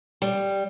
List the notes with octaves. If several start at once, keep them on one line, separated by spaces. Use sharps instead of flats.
G3